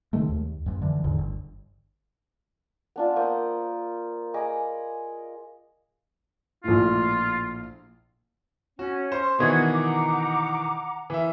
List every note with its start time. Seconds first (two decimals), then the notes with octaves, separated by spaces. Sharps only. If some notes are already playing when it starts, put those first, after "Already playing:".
0.13 C3 D#3 G#3 A3
0.29 D#2
0.66 A1 F#2
0.82 D3 E3 F3
1.04 E2 A2 D3 D#3
1.18 G1
2.96 B3 D4 F4
3.16 A#3 C5 D#6
4.34 G#4 D#5 B5 D6
6.64 A#1 A2 F4
8.79 C#4 F#4
9.12 C5 C6
9.38 B2 D#3 E3 D4 F#4 G#6
9.71 F#5 A#5 D6
11.10 E3 A#4 E5